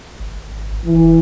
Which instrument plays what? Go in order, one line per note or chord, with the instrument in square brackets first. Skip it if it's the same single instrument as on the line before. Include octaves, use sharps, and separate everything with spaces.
[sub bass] G#1
[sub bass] E1 [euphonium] E3